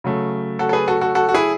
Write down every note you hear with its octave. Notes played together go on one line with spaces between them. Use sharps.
C#3 F#3 A3
F#4 A4
A4
G#4 B4
F#4 A4
F#4 A4
F#4 A4
F#4
E4 G#4